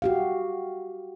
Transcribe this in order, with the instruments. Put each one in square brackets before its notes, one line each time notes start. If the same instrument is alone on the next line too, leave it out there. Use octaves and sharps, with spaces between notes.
[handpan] F#4 G4 F5